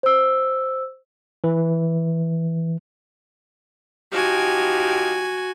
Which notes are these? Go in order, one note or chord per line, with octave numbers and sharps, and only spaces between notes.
C5 E6
E3
F3 D#4 F#4 G4 G#5